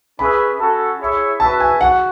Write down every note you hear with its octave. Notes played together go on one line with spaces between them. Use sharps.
C#4 G#4 B4 E5 B5
C#4 F#4 A4
E4 G#4 C#5 E5
F#4 B4 E5 A5
G#5
F#4 F#5